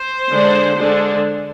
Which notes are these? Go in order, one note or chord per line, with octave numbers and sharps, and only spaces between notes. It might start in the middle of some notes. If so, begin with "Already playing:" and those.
Already playing: C5
D3 G#3 D4
D3 G#3 D4